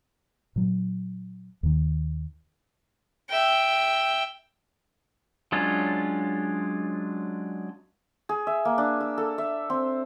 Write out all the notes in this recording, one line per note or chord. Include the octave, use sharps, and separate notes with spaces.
A#2 F#3
D#2 D#3
E5 G5
F#3 G#3 C#4 D4 F4
G#4
E5
A#3
D4
E6
A4
E5
C4